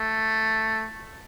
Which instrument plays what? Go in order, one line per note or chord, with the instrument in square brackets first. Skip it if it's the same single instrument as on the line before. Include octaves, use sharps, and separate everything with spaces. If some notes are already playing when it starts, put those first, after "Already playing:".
Already playing: [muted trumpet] A3